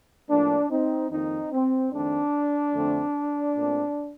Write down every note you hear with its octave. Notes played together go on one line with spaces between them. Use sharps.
A2 F3 A#3 D4
C4 D#4
F2 D#3 A#3 C4 D#4
C4
F2 D#3 A3 C4 D4
F2 D3 A3 C4
A#2 A3 C4